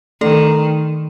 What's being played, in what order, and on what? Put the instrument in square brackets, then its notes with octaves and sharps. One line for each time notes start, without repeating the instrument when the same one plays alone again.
[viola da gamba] D#3 [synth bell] A3 A4